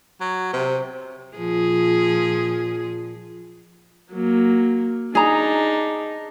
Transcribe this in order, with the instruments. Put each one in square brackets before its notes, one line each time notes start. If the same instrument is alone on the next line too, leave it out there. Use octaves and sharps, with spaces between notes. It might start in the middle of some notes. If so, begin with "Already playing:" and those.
[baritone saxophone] F#3
C3
[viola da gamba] A#2 F3 G#4
[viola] F#3 A#3
[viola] D4 D#4 [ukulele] G#4 A#5